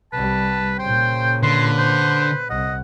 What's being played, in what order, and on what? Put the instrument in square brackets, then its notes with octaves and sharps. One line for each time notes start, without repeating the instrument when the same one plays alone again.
[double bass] C2 G3 [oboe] B4 [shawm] A5
[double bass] A#2 C#3 [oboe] C5 [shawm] G5
[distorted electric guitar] D3 [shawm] B4 [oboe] C6
[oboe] C5
[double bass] C2 [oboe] D#5 [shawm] F#5